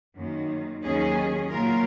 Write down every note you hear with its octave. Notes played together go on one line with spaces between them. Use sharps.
F#2 D#3 A#3
D#2 D#3 F#3 C#4 G#4
A#2 F#3 A#3 F4 A#4